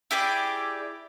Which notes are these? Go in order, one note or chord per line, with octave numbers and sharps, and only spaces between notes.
E4 G4 G#4 D5